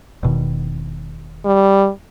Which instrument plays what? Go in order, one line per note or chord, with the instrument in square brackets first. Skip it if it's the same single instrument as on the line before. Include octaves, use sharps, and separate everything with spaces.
[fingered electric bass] E1 B2 D#3
[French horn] G3